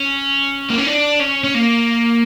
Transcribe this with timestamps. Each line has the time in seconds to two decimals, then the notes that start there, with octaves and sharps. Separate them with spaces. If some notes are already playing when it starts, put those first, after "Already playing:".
Already playing: C#4
0.70 A#3
0.78 C#4
0.87 D4
1.20 C#4
1.44 C#4
1.55 A#3